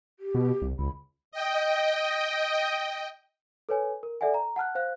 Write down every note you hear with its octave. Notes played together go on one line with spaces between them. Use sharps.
G4
B2
C2
C#2 B5
D#5 G5
A4 B4 C#5 G#5
A#4
A4 D5 E5 F#5 G#5
A#5
F#5 A5 F6 F#6
C5 F5 F#6